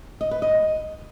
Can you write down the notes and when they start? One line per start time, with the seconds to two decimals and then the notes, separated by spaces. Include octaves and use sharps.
0.21 D#5
0.31 B4
0.42 D#5